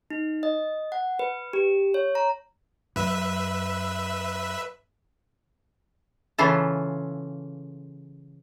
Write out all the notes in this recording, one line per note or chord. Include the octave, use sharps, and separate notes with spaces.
D#4
D#5
F#5
B4
G4
C#5
A#5
F#2 B4 E5
C#3 E3 F4 A4